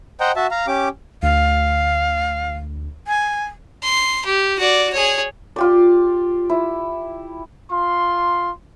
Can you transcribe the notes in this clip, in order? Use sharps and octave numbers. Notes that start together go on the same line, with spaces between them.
C5 D#5 F#5 G5 A#5
F#4 E5 A5
F5 A#5
C#4 G4 D6
D2 F5
G#5
C6
G4
F#4 D5
G#4 C#5
F4 G4 D5
E4
F4 C6